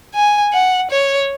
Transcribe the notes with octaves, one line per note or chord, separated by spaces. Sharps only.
G#5
F#5
C#5